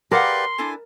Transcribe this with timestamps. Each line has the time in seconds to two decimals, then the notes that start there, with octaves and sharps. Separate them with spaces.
0.11 G4 G#4 A#4 B4 D5 F5 F#5 C6
0.58 D4 E4 A4 G#5